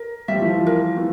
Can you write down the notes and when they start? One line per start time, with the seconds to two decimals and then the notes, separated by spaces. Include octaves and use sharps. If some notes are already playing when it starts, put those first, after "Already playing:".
Already playing: A#4
0.28 G3 E5
0.35 F3
0.42 E3
0.50 F3
0.66 A#4
0.97 E3